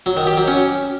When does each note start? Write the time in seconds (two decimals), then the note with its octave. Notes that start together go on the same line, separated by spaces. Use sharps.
0.06 F#3
0.17 D#3
0.27 G4
0.37 F#3
0.48 C#4